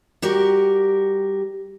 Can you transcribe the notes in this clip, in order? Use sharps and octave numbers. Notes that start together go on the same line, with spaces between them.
G3 F#4 G4 A#4